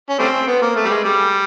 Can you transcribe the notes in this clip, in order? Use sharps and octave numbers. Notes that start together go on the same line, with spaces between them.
C#4
G3 A3 C4
B3
A#3
A3
G3
G#3
G3